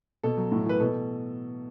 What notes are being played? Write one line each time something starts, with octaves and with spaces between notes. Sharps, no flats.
B2 A4
F#3
A2
E3 B4
B2 A4